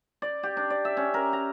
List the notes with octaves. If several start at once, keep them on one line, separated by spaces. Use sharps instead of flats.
D5
G4
D4
D5
E5
C#4
A#4
A#5